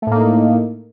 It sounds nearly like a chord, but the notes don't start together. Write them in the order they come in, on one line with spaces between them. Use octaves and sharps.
A3 A2 A#3 D#4